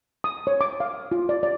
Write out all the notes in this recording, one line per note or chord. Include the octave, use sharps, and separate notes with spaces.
D#6
C#5
D6
F5
F4
D5
D5